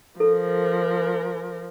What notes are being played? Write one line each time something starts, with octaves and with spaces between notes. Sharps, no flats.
F3 A4 A#4